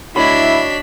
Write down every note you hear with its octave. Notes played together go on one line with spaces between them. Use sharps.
D2 D4 E4 F#4 C#5 D#5 B5 B6